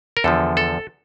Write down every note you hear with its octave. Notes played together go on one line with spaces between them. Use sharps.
A#4
E2 D3 F3 A4
A4